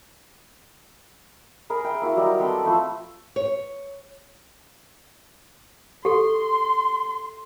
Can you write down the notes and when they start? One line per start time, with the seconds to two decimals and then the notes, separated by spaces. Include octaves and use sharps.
1.70 G#4 A#4 B5
1.84 E5 G5
2.02 A#3 E4 F#4
2.17 F#3 G3 D#5
2.39 C4 A4 B4 G5
2.64 F3 A3 B5
3.36 C#5
6.05 G4 A4 C6